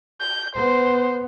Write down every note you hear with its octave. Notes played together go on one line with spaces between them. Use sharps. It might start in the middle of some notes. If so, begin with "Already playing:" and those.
G6
B3 C5